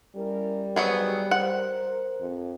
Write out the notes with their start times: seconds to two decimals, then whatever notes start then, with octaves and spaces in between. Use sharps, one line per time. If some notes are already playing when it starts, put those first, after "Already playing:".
0.16 G3 C#4 E4 A#4
0.76 D#2 G#2 F#3 B3 G#4
1.31 A#4 C5 F#5
2.21 F2